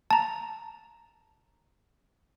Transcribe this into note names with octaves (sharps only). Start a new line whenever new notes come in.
A5 A#5